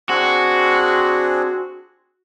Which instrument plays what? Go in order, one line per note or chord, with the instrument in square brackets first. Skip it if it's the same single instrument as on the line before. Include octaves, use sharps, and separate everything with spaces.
[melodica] C4 D4 G#4 [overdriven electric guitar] F#4